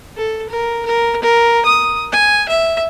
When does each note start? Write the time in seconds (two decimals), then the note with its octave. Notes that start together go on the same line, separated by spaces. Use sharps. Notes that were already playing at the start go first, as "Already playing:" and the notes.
0.17 A4
0.50 A#4
0.86 A#4
1.22 A#4
1.66 D#6
2.12 G#5
2.49 E5